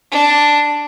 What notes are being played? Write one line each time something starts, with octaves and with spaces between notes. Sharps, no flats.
D4